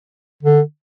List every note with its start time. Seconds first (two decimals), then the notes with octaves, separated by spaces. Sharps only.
0.43 D3